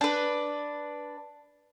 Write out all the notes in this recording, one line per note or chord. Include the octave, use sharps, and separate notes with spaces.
D4 B4